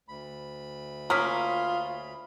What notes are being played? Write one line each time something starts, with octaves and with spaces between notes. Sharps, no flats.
D2 B5
A#3 C#4 F4 D#6 F6 B6